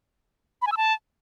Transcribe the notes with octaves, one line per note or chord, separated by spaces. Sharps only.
B5
G#5
E6
A5